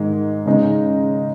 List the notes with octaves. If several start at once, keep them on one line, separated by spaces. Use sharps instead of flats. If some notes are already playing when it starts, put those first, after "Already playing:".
Already playing: G#2 D#3 G#3
C#3 G#3 D#4